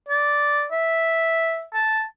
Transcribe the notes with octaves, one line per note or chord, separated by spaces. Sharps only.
D5
E5
A5